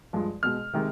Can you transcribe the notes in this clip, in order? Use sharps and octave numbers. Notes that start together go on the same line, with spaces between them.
G2 F3 G#3
B2 G#3 F6
C3 D#3 G#3